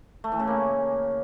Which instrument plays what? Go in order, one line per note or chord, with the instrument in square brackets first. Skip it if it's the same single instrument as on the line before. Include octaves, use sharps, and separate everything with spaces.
[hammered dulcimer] A3
E3
C#3
A#3